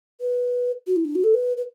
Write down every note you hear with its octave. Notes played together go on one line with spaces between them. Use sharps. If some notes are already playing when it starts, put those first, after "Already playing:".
B4
F#4
E4
D4
F#4
A4
B4
B4